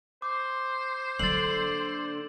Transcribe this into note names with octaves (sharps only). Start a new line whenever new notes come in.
C5 D6
D3 F#3 A#3 A6 F#7